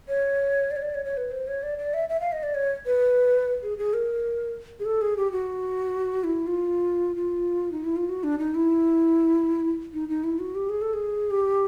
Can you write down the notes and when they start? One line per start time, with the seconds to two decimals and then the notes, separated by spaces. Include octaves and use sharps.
0.09 C#5
0.71 D5
0.76 C#5
0.82 D5
0.94 C#5
1.05 C#5
1.17 B4
1.32 C5
1.47 C#5
1.63 D5
1.78 D5
1.94 E5
2.09 E5
2.20 F5
2.32 D#5
2.43 D5
2.55 C#5
2.86 B4
3.63 G#4
3.78 G#4
3.94 A#4
4.80 G#4
4.85 A4
5.01 G#4
5.17 G4
5.31 F#4
6.24 E4
6.47 F4
7.16 F4
7.72 D#4
7.84 E4
7.96 F4
8.09 F#4
8.24 D4
8.39 D#4
8.55 E4
9.93 D#4
10.09 D#4
10.24 E4
10.39 F#4
10.55 G4
10.69 G#4
10.82 A4
10.94 G#4
11.31 G4